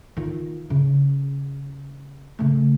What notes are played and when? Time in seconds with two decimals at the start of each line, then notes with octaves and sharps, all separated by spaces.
0.17 D#3 F4
0.70 C#3
2.39 C#3 A3